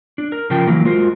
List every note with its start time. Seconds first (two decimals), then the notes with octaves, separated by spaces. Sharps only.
0.18 D4
0.32 A#4
0.50 C#3 F3 A#4 G5 A5
0.67 E3 F#3 A#3
0.85 G#3 F4 F#4 A#4 C5